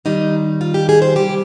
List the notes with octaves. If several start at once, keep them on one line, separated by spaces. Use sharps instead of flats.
D#2 D#3 G3 D#4
F4
G4
G#4
C5
C3 G3 G4